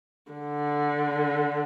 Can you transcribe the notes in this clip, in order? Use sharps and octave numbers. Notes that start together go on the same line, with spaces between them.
D3